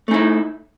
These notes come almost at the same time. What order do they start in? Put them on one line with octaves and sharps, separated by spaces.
A3 D#4 E4